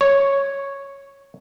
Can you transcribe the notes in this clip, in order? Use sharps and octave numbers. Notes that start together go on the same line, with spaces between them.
C#5